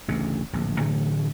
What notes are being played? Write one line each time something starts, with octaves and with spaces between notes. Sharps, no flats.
A1 D2 C#3
D1 A#1
A2 D3 E3 A3